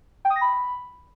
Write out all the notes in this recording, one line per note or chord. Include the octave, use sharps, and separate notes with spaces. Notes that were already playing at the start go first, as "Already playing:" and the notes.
G5
D#6
A#6
B5